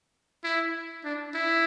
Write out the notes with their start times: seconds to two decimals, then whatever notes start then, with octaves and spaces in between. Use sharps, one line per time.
0.44 E4
1.04 D4
1.35 E4